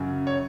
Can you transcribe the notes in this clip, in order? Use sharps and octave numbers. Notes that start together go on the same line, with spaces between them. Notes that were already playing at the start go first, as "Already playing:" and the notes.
Already playing: F#2 C#3 F#3
C#5